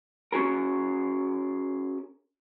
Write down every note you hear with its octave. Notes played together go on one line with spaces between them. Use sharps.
C#4 F#4 G#4 A#4